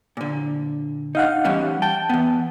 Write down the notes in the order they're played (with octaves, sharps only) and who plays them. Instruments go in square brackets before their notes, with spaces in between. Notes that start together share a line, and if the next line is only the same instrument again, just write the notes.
[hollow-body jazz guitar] A#2 D3
[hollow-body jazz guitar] D#4 [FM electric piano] D#5 F5 F#5
[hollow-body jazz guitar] E3 G3 C#4
[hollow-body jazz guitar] G5 [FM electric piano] A5
[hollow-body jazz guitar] E3 B3